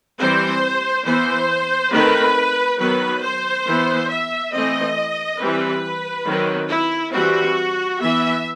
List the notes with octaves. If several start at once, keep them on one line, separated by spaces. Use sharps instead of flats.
E3 G3 C4 C5
E3 B3 C5
D#3 A3 C4 B4
D#3 F#3 B3 B4
C5
E3 B3
E5
E3 A3 C4 D#5
E3 G3 C4 B4
D#3 F#3 C4
E4
E3 G3 C4 F#4
E3 B3 E5